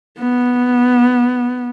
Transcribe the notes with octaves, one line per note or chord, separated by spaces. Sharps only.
B3